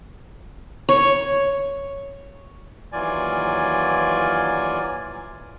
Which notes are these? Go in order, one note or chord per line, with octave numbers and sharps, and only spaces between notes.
C#5
D#2 E3 F#3 F4 D5 G#5